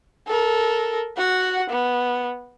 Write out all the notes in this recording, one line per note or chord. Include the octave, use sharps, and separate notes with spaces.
A4 A#4
F#4 F#5
B3